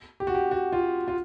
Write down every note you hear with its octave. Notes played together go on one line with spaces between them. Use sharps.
G4
F#4
G4
F#4
F4
F4